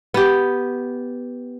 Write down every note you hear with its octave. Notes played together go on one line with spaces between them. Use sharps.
B3 G4